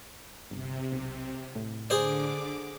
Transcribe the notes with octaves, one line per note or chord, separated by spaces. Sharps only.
G1 C3
B1
A2
D3 G#4 C5 D5 D6